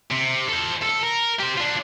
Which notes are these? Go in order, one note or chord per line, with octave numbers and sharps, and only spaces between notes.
C3
A4 C5
C2 A4
A#4
G4 C5
D4 F4